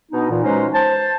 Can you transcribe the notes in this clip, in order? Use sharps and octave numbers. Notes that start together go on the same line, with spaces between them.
B2 B3 D4 D#4
A#2 E3
F#3 G#3 C#4 D#4 B4 C5
C5 A5